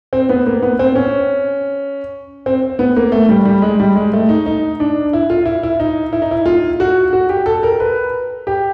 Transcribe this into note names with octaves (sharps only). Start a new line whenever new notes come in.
C4
B3
A#3
B3
C4
C#4
C4
B3
A#3
A3
G3
G3
G#3
G3
G#3
A3
D#4
D#4
D4
E4
F4
E4
E4
D#4
E4
D#4
E4
F4
F#4
F#4
G4
A4
A#4
B4
G4